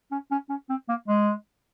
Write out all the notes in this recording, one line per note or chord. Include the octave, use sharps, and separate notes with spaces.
C#4
C#4
C#4
C4
A#3
G#3